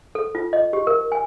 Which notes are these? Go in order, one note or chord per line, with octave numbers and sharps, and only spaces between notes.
A4
F4
D#5
G4
A#4
G#5